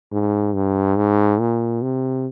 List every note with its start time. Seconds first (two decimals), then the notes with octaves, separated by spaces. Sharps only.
0.12 G#2
0.55 G2
0.97 G#2
1.40 A#2
1.82 C3